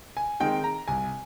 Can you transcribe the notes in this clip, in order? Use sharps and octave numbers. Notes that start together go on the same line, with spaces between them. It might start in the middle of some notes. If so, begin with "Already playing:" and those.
G#5
D#3 G#3 C4 G5
A#5
C2 G#5